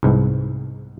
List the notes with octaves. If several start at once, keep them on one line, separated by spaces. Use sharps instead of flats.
C2 G#2 B3